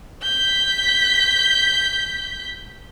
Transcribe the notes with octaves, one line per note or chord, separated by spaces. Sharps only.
G6 B6